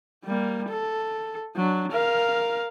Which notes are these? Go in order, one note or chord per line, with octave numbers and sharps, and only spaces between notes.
G3 A#3
A4
F#3 D4
A#4 F5